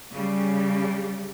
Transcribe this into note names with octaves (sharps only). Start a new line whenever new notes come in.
C#3 G3